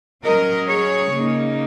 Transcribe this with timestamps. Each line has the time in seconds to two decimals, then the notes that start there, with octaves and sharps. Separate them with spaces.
0.24 F#3 C#4 A#4 D#5
0.68 G#4 C#5
1.11 C#3 A#3 D#4